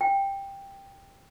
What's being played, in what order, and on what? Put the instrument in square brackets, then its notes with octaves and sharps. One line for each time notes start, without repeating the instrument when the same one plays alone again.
[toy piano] G5